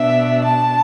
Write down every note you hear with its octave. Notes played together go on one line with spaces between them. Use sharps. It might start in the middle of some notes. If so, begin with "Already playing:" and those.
Already playing: B2 B3 D4 E5
A5